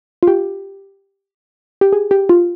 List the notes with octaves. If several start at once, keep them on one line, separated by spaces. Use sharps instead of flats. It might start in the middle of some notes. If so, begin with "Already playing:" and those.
F4
G4
G4
G#4
G4
F4